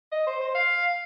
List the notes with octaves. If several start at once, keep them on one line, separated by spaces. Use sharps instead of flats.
D#5
C5
C5
F5